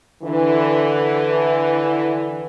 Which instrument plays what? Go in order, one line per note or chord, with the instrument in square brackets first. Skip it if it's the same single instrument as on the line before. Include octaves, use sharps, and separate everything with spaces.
[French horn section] D3 E3